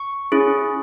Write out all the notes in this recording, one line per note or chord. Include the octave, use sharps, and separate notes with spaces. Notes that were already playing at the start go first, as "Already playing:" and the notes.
Already playing: C#6
C#4 E4 G#4